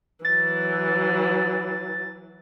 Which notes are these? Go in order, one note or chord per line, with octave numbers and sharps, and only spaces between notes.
E3 F#3 A6